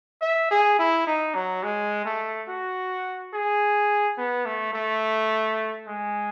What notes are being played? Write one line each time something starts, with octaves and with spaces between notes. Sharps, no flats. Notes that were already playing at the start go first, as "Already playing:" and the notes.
E5
G#4
E4
D#4
F#3
G#3
A3
F#4
G#4
B3
A3
A3
G#3